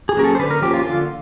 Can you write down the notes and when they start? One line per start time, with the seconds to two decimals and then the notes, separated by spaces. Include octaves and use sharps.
0.09 G#4
0.17 F#3 A#3 C#4 A#4
0.24 A4
0.35 C5
0.39 D3 B4
0.50 A#4
0.62 F3 A#3 C#4 G4
0.74 F4
0.85 D3 F4